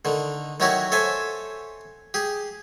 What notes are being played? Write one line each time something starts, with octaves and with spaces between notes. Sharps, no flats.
D3 D#3
D#3 F#3 E4 F#4 G4 C#5
A4 C5 C#5 E5 G#5
G4 G#4